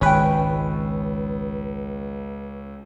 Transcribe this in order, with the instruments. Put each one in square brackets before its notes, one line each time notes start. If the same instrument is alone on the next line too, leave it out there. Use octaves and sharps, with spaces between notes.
[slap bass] G#1 [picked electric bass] C#2 [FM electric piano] C#4 B4 [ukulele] G#4 G5